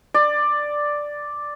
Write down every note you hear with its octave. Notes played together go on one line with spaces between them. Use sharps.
D5